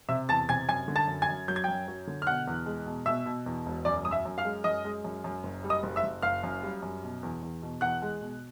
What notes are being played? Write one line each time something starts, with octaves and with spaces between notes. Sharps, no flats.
C3 E5 E6
E2 A5 A6
C3 G#5 G#6
F#2 G#5 G#6
D3
A5 A6
F#2
G#5 G#6
F#2
F#3 G6
G#6
F#2 G5 G6
F#3
D3
F6
B2 F#5 F#6
E2
G#3
B2
B2 E5 E6
B2
E2
E1
F#2 D5 D6
F#2 D#6
E5 E6
F#2
F5 F6
G#3
F#2 D#5 D#6
G#3
F#2
F#2
F#1
G3
D#5 D#6
F#1
E5 E6
F#1
F#1 F5 F6
F#2
G3
F#2
B2
E2
E2
B2
E2 F#5 F#6
G#3
B2